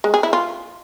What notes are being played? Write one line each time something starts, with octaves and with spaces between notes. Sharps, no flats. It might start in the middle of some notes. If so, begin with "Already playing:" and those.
G#3
G#4
E4
F4